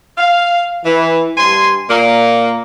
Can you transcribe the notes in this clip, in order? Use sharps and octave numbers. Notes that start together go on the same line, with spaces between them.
F5
E3
G2 G#5 C6
A#2 A#3